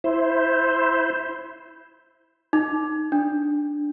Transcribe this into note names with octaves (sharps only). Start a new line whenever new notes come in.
E4 C5
D#4
D4